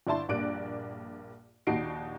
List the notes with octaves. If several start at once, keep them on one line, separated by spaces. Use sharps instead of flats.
G1 D4 E4 A5 C6
A#1 G2 A#3 D5 F#6 D7
A#1 D#2 D#4 F#4 C7 D7